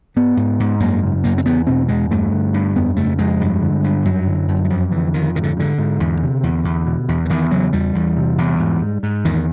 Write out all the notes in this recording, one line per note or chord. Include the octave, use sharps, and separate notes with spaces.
G#2 B3
G#2
G#2
F#2 A#3
C#3
F#2 A#3
C4
E2 B3
B2 C4
E2 G#3
G2 A3
D3
G2
F2 B3
C#3 A3
F2 G#3
G2
D3
G2
F#2 F#3
D3
F#2
F#3
F2 F3
D3 E3
F2 D#3
G#2 D#3
D3
G#2 D3
G#2
E2
C3
E2
E2
B2
E2
E3
E2 D#3
C#3 F#3
E2 G3
E2
C3
E2
G#2
G#2
G#2
E2 D#3